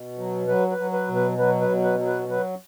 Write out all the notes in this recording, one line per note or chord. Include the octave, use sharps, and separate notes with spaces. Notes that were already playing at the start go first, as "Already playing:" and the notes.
Already playing: B2
F#3
F#3 B4
B4
F#3
B4
B2
B4
F#3 B4
B4
B2
B4
F#3
B4
F#3 B4